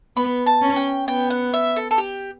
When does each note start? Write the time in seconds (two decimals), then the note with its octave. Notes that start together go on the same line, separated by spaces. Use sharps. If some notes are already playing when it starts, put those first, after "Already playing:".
0.16 B3 B5
0.46 A5
0.62 C#4
0.76 G5
1.08 B3 G5
1.30 F#5
1.53 E5
1.76 A4
1.91 A4
1.98 G4